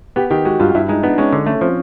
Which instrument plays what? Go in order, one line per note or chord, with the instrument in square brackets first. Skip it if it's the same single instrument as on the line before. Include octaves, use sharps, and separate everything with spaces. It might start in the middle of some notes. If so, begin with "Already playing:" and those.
[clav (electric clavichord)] B3 [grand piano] G4
[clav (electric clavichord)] D#3 [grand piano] G4
[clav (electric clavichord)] G#3 [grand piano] F#4
[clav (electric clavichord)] G2 [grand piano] F4
[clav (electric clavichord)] G2 [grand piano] E4
[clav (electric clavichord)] G#3 [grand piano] D#4
[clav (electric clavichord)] B3 [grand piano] D4
[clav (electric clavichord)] G#3 [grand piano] C#4
[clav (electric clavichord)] D3
[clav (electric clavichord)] A3 [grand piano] C#4
[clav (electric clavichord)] F3 [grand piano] C4